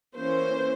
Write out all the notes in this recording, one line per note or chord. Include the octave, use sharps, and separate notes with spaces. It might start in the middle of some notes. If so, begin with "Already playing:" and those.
E3 A#3 C#4 C5